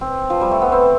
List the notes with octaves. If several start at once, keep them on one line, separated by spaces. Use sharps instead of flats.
C4
F3
G3
A3
B3
C4